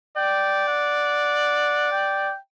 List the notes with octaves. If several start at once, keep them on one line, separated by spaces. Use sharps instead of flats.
D5 G5
F#5
G5